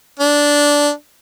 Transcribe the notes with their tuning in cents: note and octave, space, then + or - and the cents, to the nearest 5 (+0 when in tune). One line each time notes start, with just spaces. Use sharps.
D4 -10